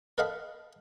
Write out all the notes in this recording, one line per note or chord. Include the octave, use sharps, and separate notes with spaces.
A4 A#4 D#5 F5 F#5 B5